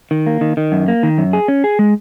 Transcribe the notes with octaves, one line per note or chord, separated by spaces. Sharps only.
D#3
A#3
D#3
D#3
F#2
A#3
D#3
F#2
G#4
C#4
G#4
G#3